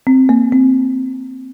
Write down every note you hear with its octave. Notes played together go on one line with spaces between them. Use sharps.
C4
A#3
C4